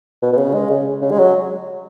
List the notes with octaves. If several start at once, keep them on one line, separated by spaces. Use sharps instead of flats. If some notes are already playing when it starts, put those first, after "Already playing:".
B2
B2
C#3
G#3
C#3
C#3
G#3
F#3